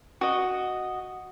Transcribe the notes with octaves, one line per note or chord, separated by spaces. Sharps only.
F#4 D#5